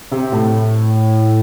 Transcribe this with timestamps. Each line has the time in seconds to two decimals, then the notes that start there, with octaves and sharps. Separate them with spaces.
0.12 C3
0.32 A2